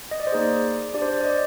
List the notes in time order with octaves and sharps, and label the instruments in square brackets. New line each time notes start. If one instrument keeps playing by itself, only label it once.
[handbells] D#5
D5
C5
A#3 D#4 G#4 D5
D4 G4 D5
C5
D5
D5
D#5